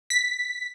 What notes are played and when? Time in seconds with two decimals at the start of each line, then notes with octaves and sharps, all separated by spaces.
0.10 B6